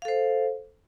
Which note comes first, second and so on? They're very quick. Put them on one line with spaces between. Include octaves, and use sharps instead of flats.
F5 A4 C5